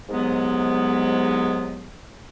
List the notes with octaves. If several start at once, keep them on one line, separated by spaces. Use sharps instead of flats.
C2 G#2 F#3 G#3 B3